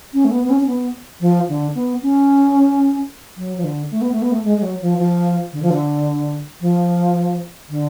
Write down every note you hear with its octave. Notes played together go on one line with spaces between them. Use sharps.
C#4
A3
B3
B3
C#4
C#4
B3
F3
D3
B3
C#4
F#3
F3
D3
A3
B3
A3
B3
A3
G#3
G#3
F#3
F3
F3
D3
F3
D3
F3
D3